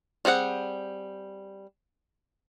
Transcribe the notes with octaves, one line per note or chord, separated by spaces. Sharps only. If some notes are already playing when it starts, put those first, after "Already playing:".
G3 C4 G#4 F#5